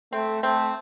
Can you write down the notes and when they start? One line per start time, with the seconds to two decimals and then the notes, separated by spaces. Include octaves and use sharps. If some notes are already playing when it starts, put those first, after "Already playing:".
0.12 A3 C4
0.42 A3 C4